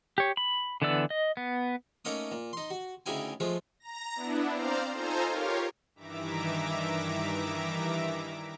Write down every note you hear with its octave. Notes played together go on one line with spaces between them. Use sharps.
G4 C#5
B5
D3 E3 B3 D5 E6
D#5
B3
A3 A#3 C#4 D#4 D#6
A#2
D#4 C6
F#4
D2 C#3 D#4 E4 G5 G#5
F3 G#3 A3
A#5 A#6
B3 D4 E4
C4 C5 D5 F5 A#5
D#4 F4 A4 C5 G#5 A#5
F4 G4 A#4 C#5 F5
G2 D#3 E3 E5 A#5 D6